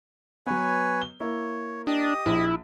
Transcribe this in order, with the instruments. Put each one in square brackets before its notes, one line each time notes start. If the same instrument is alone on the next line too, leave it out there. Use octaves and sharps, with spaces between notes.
[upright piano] F#3 B3 [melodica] B4 C#5 G#5
[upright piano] G7
[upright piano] A#3 E4 [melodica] C#5
[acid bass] D4 [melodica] G4 D#5 D#6
[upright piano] A#1 [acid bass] E4